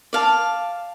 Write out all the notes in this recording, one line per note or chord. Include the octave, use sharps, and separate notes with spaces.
D5 F5 A5